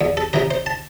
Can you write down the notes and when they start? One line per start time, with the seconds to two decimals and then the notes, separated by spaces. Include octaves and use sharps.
0.01 E2
0.17 A4
0.33 C3 E3 A#4
0.51 C5
0.66 A5